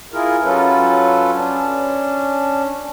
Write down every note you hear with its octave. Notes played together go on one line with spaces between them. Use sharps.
E4 F4 G#4 A#4
F#3 C#4 F4 A4 B4
C#4 D4